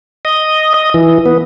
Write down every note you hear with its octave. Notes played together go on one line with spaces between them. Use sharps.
D#5
D#5
E3
B3